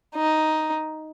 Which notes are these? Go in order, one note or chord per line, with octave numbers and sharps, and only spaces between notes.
D#4